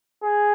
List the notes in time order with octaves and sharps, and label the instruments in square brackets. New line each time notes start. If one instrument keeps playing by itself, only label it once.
[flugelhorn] G#4